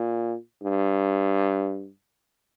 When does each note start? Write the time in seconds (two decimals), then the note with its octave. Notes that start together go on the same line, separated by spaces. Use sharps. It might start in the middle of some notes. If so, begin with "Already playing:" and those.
Already playing: A#2
0.63 G2